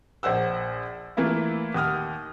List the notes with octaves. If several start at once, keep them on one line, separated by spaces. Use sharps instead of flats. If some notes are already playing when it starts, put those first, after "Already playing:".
A#1 C5 F#5 E6
E3 A3 A#3 E4 F4
D#2 F#5 D#6 F6